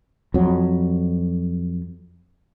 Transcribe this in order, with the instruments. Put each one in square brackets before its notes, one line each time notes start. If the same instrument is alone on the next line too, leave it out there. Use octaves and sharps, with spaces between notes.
[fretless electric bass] F2 F#3